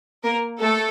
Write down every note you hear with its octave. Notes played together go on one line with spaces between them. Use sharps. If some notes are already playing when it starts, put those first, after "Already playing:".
A#3 A#4
A3 A4